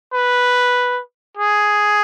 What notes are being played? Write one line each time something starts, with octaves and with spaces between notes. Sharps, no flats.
B4
G#4